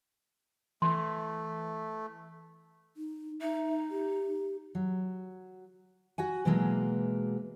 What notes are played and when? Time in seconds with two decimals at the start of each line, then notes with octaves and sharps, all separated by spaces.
0.82 E3 A3 C6
2.97 D#4
3.41 D#4 E5
3.91 G4
4.75 F#3
6.18 F#4 F#5 G#5
6.45 B2 E3 F#3 G#3 A#3